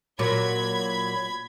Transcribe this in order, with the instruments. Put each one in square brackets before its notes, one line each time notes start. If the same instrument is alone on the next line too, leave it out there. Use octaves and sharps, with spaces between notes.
[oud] A#2 F#3 [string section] B5 G#6